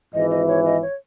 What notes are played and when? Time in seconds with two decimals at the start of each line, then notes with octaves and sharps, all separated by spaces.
0.14 G#1 G#2 E3 D#5
0.31 D#5
0.48 C#5
0.65 D#5
0.82 C#5